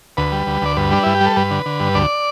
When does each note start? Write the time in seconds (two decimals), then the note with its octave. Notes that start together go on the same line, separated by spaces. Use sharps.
0.17 D2 B4
0.32 G3
0.47 D2
0.62 D2 D5
0.77 G2 B4
0.91 G3 D4
1.03 G2 E4
1.14 G4
1.21 G3
1.26 A4
1.36 G2 B4
1.51 D3
1.66 D3
1.80 G2
1.95 D2 D5